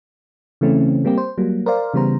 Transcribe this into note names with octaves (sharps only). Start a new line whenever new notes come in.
C#3 E3 A3 C4 C#4
G3 A#3 C4 G4
C5
F#3 G3 A#3
A#4 C5 D5 F5
C#3 E3 G3 B3 C5 A#5